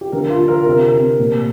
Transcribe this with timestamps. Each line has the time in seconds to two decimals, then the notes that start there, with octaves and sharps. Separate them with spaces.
0.01 G4
0.12 D3 A#4
0.30 F4
0.39 D3
0.48 A#4
0.66 C3 A#4
0.93 C3
1.19 A#2